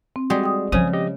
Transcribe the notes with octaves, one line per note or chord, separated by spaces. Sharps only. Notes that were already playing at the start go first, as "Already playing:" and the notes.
C4
G3 G#3 F#4 G#4
G5 D#6
C#3 F3 C4 C5 G#5 D#6
G4 D#5